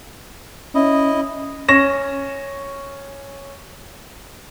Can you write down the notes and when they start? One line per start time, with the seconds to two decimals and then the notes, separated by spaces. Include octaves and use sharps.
0.75 C#4 E4 D#5
1.68 C#4 C#6 A#6 E7